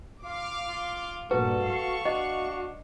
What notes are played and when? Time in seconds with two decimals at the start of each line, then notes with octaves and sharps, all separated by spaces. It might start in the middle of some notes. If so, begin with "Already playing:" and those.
0.24 F4 F5 D6
0.68 F4
1.31 G2 A#2 F#4 A4 B4
1.66 F5 C#6
2.05 D4 F#4 D#5